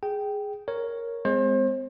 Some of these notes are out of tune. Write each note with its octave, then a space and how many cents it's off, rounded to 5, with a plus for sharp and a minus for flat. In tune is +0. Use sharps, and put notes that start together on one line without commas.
G#4 +0 G5 -10
A#4 +0 C#5 +0
G#3 -10 C4 -35 C5 +35